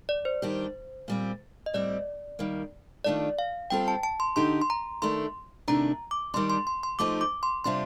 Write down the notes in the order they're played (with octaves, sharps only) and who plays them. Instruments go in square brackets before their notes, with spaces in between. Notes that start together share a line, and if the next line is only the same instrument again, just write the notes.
[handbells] D5
C5
[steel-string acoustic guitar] D#3 G3 D4 G4
A#2 G3 C4
[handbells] D#5
[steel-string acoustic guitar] A2 G3 C4 [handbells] D5
[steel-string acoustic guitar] D#3 G3 A#3
[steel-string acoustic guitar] D#3 A3 D4 F4 A4 [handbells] D5
[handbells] F5
[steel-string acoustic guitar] G3 C4 F4 A4 [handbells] G5
[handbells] A5
A5
C6
[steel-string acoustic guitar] D3 A3 D#4 G4 [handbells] C6
[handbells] C6
A#5
[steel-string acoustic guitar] D#3 A3 D4 [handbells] C6
[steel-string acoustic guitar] C3 D#3 A3 D4 [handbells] A#5
[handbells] D6
[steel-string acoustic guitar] D#3 G3 D4 [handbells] C6
[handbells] C6
C6
C6
[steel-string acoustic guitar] F3 A3 D#4 G4 [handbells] D6
[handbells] D6
C6
[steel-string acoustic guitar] C3 G3 D4 F4 [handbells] C6